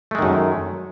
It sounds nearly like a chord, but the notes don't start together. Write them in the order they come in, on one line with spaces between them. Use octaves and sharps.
A3 G#3 D#3 F#2